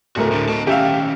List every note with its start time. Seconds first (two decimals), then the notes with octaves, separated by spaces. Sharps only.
0.16 D1 C#2 A3 F#4 A#4
0.31 A2 D3
0.48 D#5 A5
0.67 D#3 C#4 G4 E5 F5